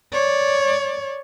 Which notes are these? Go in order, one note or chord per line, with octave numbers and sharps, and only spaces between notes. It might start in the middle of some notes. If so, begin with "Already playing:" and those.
C#5 D5